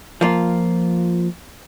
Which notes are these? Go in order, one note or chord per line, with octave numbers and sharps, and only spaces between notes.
F3 A#3 F4